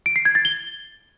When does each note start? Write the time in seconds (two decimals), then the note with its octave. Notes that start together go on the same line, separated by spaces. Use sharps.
0.06 D7
0.16 C7
0.25 G#6
0.35 A6
0.45 G7